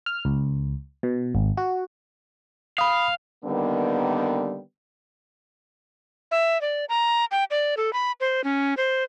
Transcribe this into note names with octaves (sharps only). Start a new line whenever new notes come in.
F6
C#2
B2
G#1
F#4
F5 B5 D#6
D3 D#3 G3 A#3 B3
E5
D5
A#5
G5
D5
A4
B5
C5
C#4
C5